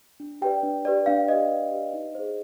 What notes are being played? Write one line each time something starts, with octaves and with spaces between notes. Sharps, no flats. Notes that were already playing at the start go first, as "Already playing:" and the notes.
D4
G4 B4 D5 G5
D4
G4 B4 D5
D4 F5
G4 B4 D5 D#5
D4
G4 B4 D5
D#4
G#4 C5